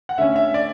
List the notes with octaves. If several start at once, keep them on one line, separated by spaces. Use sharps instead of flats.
F#5
D3 A3 C#4 E5
E5
D5